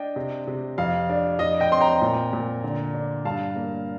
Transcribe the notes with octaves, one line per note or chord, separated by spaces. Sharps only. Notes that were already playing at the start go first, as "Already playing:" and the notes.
Already playing: D4 D#5 G5
C3
C3
F2 F5
D4
F2 D#5
D#5 G5
C4 C6
G5 A#5
A#2
A#2
D3
D4
G2 F5 A5
A#3